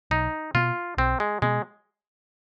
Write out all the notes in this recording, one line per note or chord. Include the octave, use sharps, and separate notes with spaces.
B1 D#4
B2 B3 F4
B1 C4
G#3
B2 G#3 B3